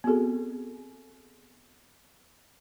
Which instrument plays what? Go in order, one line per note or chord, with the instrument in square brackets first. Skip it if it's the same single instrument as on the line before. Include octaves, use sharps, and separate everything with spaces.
[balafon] B3 C4 F#4 G#4 A4